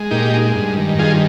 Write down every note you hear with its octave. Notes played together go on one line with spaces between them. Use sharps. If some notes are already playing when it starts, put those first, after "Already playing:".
Already playing: G#3
A#2 D#4 G4
G#3
G2
D#3
G2 F4 G#4